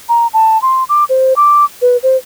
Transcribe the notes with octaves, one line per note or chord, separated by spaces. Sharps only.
A#5
A5
C6
D6
C5
D6
B4
C5